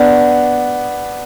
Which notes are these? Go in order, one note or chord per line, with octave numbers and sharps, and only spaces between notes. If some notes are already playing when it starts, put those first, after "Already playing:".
Already playing: B3 D4